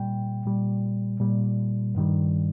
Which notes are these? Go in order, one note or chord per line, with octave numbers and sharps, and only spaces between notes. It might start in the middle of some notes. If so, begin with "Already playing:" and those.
Already playing: A#2 G3 G5
A#2 G3
A#2 G3
G2 D#3 G3